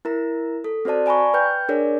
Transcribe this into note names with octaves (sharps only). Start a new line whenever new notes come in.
E4 A#4 A#5
A4
C4 F#4 C5 D5 A5
D5 G#5 A#5 B5 C#6
B4 G5 G6
D4 G#4 A#4 C#5 D5